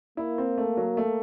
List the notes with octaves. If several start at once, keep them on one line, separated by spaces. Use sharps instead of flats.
A#3 E4
C4
A3
F#3
A3